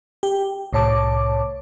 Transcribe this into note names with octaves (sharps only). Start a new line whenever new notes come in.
G4
C2 A2 C#5 A5 D6